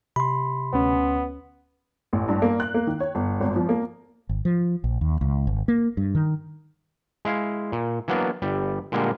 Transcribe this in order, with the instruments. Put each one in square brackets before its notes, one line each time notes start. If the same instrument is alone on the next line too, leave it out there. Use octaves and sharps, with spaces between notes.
[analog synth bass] C3 [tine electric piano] B5 C6
[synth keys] D2 C#4 [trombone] B3
[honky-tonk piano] A1
G2
A#3
F#6
A#3
D#3
C#5
G1
G#1
F3
A#3
[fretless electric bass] G#1
F3
A#1
D#2
C#2
G#1
A#3
G2
D#3
[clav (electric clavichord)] G#3 E4 F5
A#2
E3 F#3 A#3 B3 D4
G1 G3
A#2 D3 G3 G#3 A#3